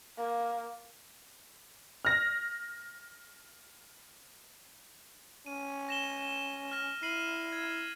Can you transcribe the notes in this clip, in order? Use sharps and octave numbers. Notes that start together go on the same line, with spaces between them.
A#3
F6 A#6
C#4 D#7
A#6 E7 G7
F6 A#6
E4 C7 D#7 F#7
G#6